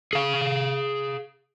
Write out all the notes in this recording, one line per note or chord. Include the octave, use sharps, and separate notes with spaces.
G#4 F5